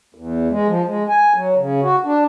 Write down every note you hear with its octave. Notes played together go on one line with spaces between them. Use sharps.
E2
G#3
F3
G#3
G#5
F#3
C#3
F#4
D4